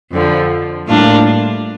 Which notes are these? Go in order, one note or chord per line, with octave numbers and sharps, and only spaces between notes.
F2 D3 F3
A2 G3 A#3 D4 F4